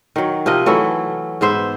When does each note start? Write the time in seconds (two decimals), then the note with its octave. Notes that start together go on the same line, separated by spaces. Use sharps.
0.16 D#3 F#3
0.46 C3 F3 A#4 D#5
0.66 E3 F#3 A3 E4
1.41 G#2 B3 C5 E5